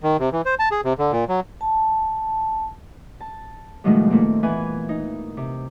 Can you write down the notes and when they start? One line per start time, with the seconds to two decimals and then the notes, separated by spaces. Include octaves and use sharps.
0.03 D#3
0.19 C3
0.32 E3
0.46 C5
0.59 A5
0.71 G#4
0.84 C3
0.99 D3
1.12 A#2
1.29 F#3
1.61 A5
3.20 A5
3.84 G2 B2 D#3 F3 G#3 A3
4.10 A#2 D#3 A3 A#3 C4
4.43 A#2 E3 B3 B4 G#5
4.89 D#4
5.37 C3